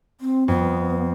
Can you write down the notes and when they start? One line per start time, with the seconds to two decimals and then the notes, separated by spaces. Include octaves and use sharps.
0.21 C4
0.48 F2 B3